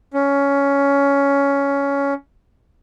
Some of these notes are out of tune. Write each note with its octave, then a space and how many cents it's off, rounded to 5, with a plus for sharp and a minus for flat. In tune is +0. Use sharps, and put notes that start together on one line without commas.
C#4 +10